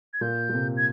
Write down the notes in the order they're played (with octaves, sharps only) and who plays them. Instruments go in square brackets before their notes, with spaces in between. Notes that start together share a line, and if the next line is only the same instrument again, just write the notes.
[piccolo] G#6
[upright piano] A#2 [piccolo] G6
[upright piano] A#2
C3
[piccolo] G#6